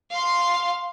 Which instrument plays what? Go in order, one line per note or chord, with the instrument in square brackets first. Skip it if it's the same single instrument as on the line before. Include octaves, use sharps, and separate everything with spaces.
[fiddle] F5 C6